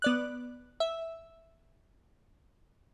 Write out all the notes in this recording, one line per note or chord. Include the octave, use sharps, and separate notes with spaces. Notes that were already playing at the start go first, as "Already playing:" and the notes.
B3 D5 F#6
E5